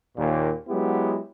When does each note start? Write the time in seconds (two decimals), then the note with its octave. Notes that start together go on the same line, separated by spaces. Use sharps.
0.17 D#2 A#2
0.69 F#3 G#3 B3 E4 G4